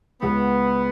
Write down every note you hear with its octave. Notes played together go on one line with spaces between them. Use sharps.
C#2 C#3 G#3 B3